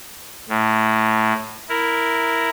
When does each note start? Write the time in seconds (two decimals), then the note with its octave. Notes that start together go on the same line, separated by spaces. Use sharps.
0.49 A2
1.69 E4 A#4